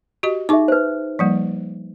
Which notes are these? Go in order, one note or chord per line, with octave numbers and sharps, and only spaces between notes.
F#4 G4 D#5
D#4 G#4 E5 C#6 D6
B4 C5
F3 G3 A#3